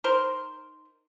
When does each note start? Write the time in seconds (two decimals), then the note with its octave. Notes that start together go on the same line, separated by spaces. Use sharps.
0.04 D#4 A#4 C5